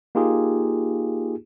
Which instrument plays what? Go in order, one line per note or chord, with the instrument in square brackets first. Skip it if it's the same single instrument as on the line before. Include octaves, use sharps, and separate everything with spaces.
[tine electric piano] A#3 D#4 F4 G4 G#4